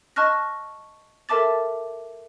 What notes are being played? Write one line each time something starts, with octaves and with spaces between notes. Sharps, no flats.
D#5 A5 C#6 F6 F#6 A#6
A4 A#4 E5 A5 D6 A6